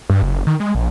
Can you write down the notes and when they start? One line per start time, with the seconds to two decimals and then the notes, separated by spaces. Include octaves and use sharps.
0.10 G2
0.22 F#1
0.47 D#3
0.60 G#3
0.75 A#1